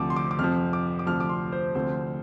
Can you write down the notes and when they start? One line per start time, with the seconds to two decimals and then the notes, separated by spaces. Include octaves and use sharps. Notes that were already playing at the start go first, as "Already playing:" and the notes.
Already playing: D2 C3 F3 D6
0.10 C6
0.16 D6
0.31 D6
0.39 F2 C3 F3 F6
0.73 D6
0.99 D6
1.06 D2 C3 F3 F6
1.20 D6
1.29 C6
1.52 C5
1.75 D2 C3 F3 C5